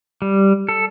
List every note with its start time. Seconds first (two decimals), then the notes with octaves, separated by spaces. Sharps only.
0.22 G3
0.69 A4